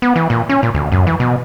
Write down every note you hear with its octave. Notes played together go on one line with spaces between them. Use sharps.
B3
E3
A#2
C#4
A#2
D2
F#2
E3
B2